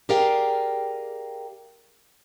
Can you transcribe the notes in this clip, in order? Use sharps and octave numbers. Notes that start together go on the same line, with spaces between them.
G4 G#4 A#4 D5 F5 G5